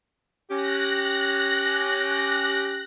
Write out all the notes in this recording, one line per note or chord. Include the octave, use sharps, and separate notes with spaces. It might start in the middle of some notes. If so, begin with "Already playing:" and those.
C#4 G4 F#6 A#6